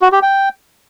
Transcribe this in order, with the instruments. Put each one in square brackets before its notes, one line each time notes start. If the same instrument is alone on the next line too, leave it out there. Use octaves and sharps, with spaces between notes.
[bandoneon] F#4
G4
G5